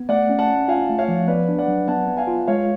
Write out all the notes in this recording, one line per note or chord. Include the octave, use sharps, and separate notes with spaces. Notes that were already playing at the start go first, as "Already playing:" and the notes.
Already playing: B3
A3 D5 F#5
C#4
F#5 A5
C#4
F4 F5 G#5
A3
C#5 F5
F3
B3 B4 D5
D4
D5 F#5
F#3
B3 F#5 A5
B3
F5 G#5
F4
G#3 C#5 F5